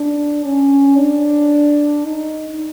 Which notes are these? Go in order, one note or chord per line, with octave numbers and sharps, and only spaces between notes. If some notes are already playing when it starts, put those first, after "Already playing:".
Already playing: D4
C#4
D4
D#4